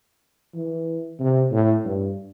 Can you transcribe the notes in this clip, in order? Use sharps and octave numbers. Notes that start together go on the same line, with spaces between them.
E3
C3
A2
G2